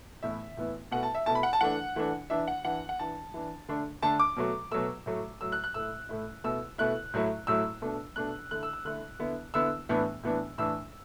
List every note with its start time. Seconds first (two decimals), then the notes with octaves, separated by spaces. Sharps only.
0.23 A2 E3 B3 E4 E5
0.57 A2 E3 B3 E4
0.91 B2 A3 E4 F#5
1.03 A5
1.15 E5
1.26 B2 A3 E4 A5
1.35 B5
1.43 F#5
1.53 A5
1.61 E3 A3 D4 F#5
1.96 E3 A3 D4
2.30 E3 D4 E5
2.48 F#5
2.65 E3 D4 F#5
2.89 F#5
2.99 E3 D4 A5
3.34 E3 D4
3.69 D3 A3 D4
4.03 D3 A3 D4 A5
4.20 D6
4.36 B2 F#3 A3
4.72 B2 F#3 A3 E6
5.06 A2 F#3 A3
5.41 A2 F#3 A3 E6
5.52 F#6
5.64 F#6
5.74 A2 A3 E4 E6
6.09 A2 A3 E4
6.44 B2 A3 E4 E6
6.78 B2 A3 E4 F#6
7.14 A2 F#3 A3 E4
7.47 A2 F#3 A3 E4 E6
7.82 B2 A3 D4
8.16 B2 A3 D4 F#6
8.51 D3 A3 E4 F#6
8.63 E6
8.73 E6
8.85 D3 A3 E4 F#6
9.19 D3 B3 E4
9.54 D3 B3 E4 E6
9.89 A2 E3 B3 D4
10.23 A2 E3 B3 D4
10.58 A2 E3 D4 E6